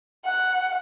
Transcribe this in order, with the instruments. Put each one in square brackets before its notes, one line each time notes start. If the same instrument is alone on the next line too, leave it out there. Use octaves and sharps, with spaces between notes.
[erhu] F#5